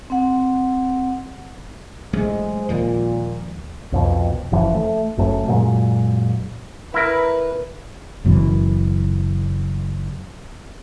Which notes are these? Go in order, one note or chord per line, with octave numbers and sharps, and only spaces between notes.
C4 F#5
A1 F#3 G#3 A3 C5
D#2 A#2 F3 G#3
C2 F2 B2
F#1 F#2 E3 F3
A3
F#1 F#2 A3 C#4
F#2 A#2 F#3 G#3
E4 A#4 B4
F#1 F#2 B2 E3